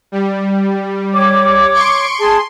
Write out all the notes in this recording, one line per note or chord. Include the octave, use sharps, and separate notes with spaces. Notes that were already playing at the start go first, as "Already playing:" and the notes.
G3
C#5 D6
C6 C#6 D7
G#4 A5 C6